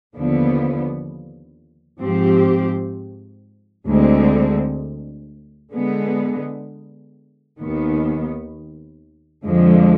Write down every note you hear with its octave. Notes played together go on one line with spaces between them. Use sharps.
D#2 D3 F3 B3
G#2 F3 C4 G4
D2 D3 G#3 C4
D3 G#3 B3
D#2 D#3 B3
F2 D3 F3 G#3